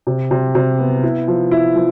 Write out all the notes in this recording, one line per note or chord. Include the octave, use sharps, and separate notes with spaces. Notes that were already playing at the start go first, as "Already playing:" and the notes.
C3
C3
C3
B3
E4
F3
E4
F3